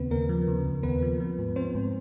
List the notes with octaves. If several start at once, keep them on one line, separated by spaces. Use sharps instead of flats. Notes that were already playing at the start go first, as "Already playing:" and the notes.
Already playing: D#2 C#3 B3 C4 B4
D#2 A#3 A#4
F3
C#3
D#2
D#2 B3 B4
F3
F3
G#2
F3 C4 C5
G#2